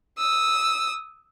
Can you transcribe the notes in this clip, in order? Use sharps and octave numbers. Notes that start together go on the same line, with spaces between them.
D#6 E6